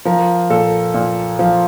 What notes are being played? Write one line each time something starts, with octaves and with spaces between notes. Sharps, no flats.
F3 A#4
A#2 A4
A#2
F3